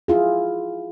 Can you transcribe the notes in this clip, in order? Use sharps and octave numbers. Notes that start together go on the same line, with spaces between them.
E4 F4 G#4